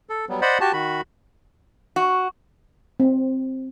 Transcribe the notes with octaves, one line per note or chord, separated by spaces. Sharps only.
A4
F#3 G3 B3
C5 D5 D#5 F#5 B5
F#4 G4 A5
D#3 F#4 B5
F#4
C4